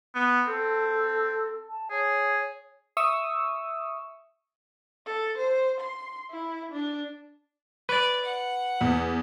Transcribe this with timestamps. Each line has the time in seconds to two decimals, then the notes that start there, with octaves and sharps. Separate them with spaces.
0.15 B3
0.47 C4 A4
1.69 A5
1.91 G#4 C#5
2.97 E5 C#6 D#6 E6
5.06 A4
5.38 C5
5.81 C6
6.31 E4
6.72 D4
7.89 B4 D5
8.24 F#5
8.81 E2